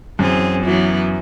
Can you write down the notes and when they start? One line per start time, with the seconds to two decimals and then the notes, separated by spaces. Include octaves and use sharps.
0.19 F#2 E3 C4 G#4
0.63 E3 F#3 B3